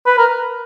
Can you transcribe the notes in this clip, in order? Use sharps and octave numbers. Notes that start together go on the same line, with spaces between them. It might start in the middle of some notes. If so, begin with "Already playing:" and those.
B4
A#4